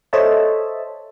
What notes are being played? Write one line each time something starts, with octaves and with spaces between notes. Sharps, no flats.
A4 C5 C#5 D#5 E5 A5